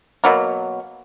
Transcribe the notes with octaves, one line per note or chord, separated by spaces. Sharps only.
B2 F#3 A#3